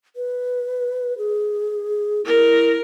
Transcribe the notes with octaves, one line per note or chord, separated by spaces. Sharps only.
B4
G#4
E4 A#4